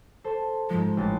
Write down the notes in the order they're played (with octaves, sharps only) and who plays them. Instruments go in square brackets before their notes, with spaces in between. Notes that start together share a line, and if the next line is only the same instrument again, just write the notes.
[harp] A4 C5
[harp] G#2 F3 [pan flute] G#3
[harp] A1 G5 A6